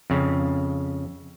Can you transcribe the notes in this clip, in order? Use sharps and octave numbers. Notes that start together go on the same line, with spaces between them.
F2 C#3